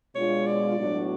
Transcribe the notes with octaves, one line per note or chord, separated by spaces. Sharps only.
B2 G#3 D4 F4 C#5
D5
A2 F#3 B3 D4 F#4